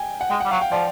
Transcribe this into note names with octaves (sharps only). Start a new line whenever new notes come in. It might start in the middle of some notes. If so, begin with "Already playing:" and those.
Already playing: G5 G#5
F#5
G#3 G5
G3 F#5
F#3 F5
G5
F3 D5